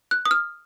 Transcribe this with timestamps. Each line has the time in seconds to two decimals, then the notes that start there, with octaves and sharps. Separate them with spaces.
0.11 F#6
0.26 D#6
0.31 F6